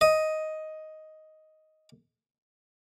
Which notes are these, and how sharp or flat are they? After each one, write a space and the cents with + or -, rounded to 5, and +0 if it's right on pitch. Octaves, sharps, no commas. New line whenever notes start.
D#5 +5